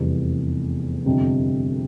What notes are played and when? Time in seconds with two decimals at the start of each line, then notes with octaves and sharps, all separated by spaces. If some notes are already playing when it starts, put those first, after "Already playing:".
Already playing: F1 E2 C3 G3
1.06 G1 F2 C3